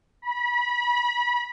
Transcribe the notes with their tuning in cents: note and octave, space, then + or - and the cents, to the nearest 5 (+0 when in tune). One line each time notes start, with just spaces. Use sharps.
B5 -30